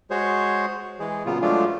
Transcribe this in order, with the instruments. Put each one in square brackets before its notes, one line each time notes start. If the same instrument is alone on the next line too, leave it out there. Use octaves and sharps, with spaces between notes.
[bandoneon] G#3 F#4 G#4 C5 C#5
E3 G#3 G#4
A#2 C#3 F#3 B3 F4
F3 F#3 G#3 A3 D4 F4